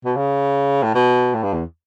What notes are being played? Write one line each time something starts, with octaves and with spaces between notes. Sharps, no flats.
B2
C#3
A2
B2
A2
G2
E2